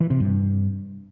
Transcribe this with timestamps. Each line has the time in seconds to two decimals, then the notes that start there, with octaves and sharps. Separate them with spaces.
0.01 E3
0.10 C3
0.20 G2